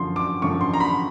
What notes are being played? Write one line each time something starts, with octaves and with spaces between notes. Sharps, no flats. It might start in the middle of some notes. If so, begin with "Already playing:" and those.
Already playing: F#2 D3 F3 C6
D6
F#2 D3 F3 C#6
C6
A#5
B5